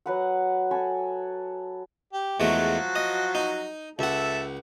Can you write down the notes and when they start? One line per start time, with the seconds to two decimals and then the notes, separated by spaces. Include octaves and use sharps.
0.06 F#3 B4 F#5
0.71 A4 G#5 B5 C#6
2.13 G4
2.40 E2 F3 F#3 G#3 A3 F#4
2.96 D#5
3.35 D#4
3.99 C#2 A4 E5 F#5